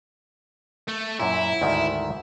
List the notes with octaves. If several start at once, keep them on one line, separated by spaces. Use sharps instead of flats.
A3
F#2 A#2 E4
D2 G#2 D#3